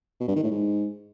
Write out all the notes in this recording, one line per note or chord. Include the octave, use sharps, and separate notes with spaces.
B2
G2
D#3
A2
G#2